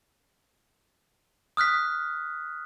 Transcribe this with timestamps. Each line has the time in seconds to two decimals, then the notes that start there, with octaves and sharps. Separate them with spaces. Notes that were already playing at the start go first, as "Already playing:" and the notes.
1.57 D#6 F6 F#6 B6